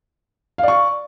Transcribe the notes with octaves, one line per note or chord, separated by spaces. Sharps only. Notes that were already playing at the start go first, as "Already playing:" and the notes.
D5 F5 C#6